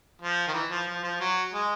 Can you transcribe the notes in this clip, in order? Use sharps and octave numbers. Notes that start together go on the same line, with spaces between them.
F3
D#3
E3
F3
F3
F3
F#3
G#3